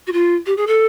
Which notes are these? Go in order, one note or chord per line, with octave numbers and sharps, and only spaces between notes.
F#4
F4
G4
G#4
A4